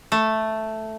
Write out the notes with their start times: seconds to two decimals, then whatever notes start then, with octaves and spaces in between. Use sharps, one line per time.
0.12 A3